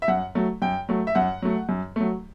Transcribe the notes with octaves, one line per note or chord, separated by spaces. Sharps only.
E5
F#2 F#5
F#3 A3
F#2 G5
F#3 A3
E5
F#2 F#5
F#3 A3
F#2
F#3 A3